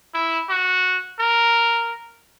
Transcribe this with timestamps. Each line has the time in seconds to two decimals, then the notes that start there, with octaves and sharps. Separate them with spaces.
0.14 E4
0.49 F#4
1.19 A#4